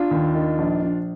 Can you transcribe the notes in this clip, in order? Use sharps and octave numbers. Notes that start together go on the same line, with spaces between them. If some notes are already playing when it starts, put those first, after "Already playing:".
Already playing: D4 F4
D#2
D#3
A#1
A#1